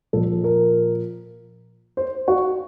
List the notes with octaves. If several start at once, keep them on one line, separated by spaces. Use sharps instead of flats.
A#2 F3 A4
A#4
C5
F#4